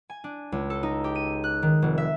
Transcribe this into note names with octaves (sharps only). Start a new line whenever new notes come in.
G#5
D4
C#2
A4
D#4
G4
D#7
F#6
D#3
F1
E5